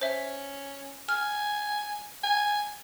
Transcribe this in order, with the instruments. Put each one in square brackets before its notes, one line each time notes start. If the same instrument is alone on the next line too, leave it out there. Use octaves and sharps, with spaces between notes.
[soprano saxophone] C#4 [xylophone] C5 E5
[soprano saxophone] G#5 [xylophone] F6
[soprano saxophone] G#5